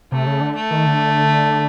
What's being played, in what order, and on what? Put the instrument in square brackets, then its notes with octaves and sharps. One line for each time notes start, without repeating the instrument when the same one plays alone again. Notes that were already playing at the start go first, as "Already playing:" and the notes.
[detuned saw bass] C3 [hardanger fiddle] A3
[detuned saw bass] C#3
D3
[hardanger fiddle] A3
[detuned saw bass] D#3
D3